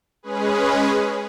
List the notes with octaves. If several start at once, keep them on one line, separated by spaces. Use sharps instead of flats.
G#3 C#4 G#4 B4